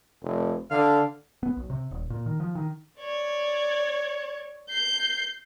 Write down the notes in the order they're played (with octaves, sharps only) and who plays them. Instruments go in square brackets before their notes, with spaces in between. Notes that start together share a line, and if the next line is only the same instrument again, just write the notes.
[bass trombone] F1
[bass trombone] D3 [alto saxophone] F5
[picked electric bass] B3
B1
C3
D#1
A#2
D#3
F3
D#3
[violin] C#5 D5
G6 C7